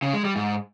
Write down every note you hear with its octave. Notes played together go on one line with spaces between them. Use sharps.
C#3
G#3
G3
G#2